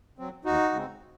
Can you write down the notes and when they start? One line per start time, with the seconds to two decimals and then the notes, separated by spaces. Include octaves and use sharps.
0.19 F#3 C4
0.45 D#2 D#4 F#4
0.72 C#3 G#3 C4